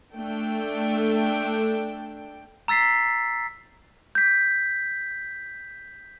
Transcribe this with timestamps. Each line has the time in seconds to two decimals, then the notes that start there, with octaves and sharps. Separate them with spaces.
0.13 A3 D4 A4 G5
2.68 A#5 E6 A6 B6 C7
4.15 G6 B6